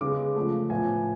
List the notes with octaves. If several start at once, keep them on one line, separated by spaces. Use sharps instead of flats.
C#3 G#3 B3 D6
C#3 F3 A3
A2 F3 B3 G#5